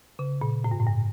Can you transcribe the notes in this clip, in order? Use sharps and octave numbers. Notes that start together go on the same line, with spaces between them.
C#3
A#2
A2
G2
A2
G2